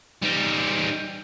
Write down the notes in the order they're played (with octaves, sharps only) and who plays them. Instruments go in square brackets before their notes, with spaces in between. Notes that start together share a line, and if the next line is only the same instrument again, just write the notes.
[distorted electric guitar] G3 D#4